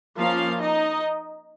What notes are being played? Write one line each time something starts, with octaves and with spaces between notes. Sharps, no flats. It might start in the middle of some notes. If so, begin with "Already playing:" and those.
F3 A#3 C#4 F4 F5
D#4 D#5